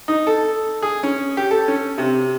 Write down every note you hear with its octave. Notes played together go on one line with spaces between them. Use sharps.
D#4
A4
G#4
C#4
G4
A4
C#4
C3